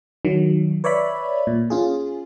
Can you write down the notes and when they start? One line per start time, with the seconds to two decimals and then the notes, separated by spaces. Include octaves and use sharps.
0.25 D#3 F#3
0.84 B4 C#5 D5 E5 B5
1.47 A#2
1.70 C#4 F4 G#4